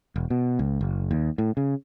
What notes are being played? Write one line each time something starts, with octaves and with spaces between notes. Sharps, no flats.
E1
B2
C#2
F#1
D#2
A2
C#3